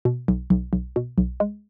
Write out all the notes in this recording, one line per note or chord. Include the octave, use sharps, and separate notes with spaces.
B2
B1
B1
B1
B2
B1
G#3